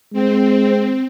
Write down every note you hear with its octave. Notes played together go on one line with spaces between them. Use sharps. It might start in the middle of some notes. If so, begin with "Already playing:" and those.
G#3 C4